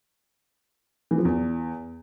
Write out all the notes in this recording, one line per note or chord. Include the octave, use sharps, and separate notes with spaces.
E3
F3
E2